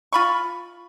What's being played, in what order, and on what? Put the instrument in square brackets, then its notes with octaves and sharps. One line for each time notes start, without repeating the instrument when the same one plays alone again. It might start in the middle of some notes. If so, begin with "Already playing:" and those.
[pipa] F4 B5 C#6